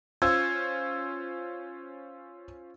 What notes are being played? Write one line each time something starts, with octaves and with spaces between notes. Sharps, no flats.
C#4 F4 C5 E6 G#6